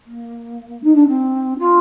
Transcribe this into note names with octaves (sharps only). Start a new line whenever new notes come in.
A#3
D#4
D4
C4
F4